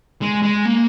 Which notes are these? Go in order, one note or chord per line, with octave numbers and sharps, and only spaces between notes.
G#3
G#3
A#3